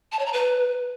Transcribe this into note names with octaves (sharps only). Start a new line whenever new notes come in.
A5
C#5
A#5
B4